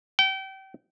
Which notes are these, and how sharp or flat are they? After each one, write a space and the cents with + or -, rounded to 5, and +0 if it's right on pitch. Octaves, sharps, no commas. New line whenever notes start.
G5 -30